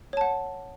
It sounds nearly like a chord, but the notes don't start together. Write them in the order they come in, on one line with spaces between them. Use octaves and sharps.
C#5 A5 F#5